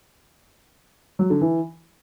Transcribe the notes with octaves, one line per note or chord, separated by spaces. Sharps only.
F#3
D3
E3